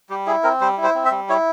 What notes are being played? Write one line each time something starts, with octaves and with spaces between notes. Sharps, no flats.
G3 G4
E4 G#4
C4 A#4
G3 C5
E4
C5
C4
E5
G3
E4 C#5